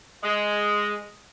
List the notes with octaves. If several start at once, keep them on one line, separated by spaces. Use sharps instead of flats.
G#3